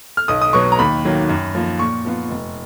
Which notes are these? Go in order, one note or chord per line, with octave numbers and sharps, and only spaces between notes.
F6
B1 D#6
D#6
B2 F#3 C#6
A#5
D#2 B5
D#3 F#3 A#3
F#2
F3 A#3
A#2 C#6
F3 B3 F4
F1